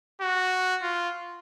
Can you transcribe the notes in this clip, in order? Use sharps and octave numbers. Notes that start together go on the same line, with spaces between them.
F#4
F4